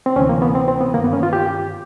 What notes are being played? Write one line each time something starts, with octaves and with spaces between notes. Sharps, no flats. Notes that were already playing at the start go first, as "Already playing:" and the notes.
C4
D2 C3 E3 C#4
A#3
B3
C4
C4
B3
G2 D#3 A#3
B3
C#4
F4
G4